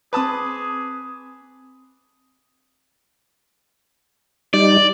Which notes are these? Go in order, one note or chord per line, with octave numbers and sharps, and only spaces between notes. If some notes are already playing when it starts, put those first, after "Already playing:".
C4 G#4 B4 A5 D6 D#6
G3 D#4 D5